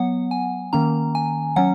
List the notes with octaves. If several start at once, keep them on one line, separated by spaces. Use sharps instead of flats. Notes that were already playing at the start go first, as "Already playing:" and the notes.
Already playing: F#3 B3 F#5
G#5
D#3 A#3 C#4 A#5
G#5
F#3 C#4 F#5